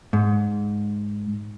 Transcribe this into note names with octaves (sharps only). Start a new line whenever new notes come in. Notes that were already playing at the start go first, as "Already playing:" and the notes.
G#2